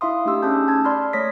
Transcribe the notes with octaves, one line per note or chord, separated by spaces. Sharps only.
D#4 E4 E5 F5 C6 D#6
A3 D4 D#4 G4 C6 E6
C#4 G#4 A5 D#6 G6
A5 G#6
D5 B5 C6 F6 G#6
A3 C#5 D#6 A#6 B6